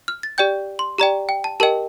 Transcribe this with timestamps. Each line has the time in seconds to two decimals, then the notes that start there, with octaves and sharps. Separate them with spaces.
0.08 F6
0.23 A6
0.38 G4 D5 G5 G6
0.79 C6
0.98 G4 D5 G5 A#5
1.29 G5
1.44 A5
1.60 G4 A#4 D#5 G5 A5